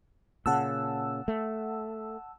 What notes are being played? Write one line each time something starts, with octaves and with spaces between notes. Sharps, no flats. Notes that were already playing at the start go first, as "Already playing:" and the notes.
A#2 C#3 F#5 A5 E6
A3